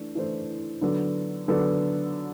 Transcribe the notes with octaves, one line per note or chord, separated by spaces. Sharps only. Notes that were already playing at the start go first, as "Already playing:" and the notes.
Already playing: E3 A3 D4
E3 A3 D4 A4 C5
D3 F#3 B3 D4 A4
D3 F#3 B3 D4 A4